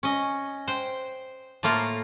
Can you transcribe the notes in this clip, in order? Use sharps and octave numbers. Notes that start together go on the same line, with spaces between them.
C#4 D#5
C5 G5
A2 A3 A#3 F4 A#4